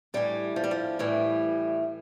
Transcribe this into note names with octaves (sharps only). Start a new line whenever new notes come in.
A2 E3 G3
F3
G3
F3
A2 E3 G3